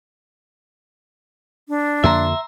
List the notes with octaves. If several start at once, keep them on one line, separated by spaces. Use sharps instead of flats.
D4
F2 D3 A#3 E5 A#5 C6 E6